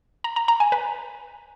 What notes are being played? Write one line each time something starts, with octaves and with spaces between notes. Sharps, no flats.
A#5
A#5
A#5
G#5
B4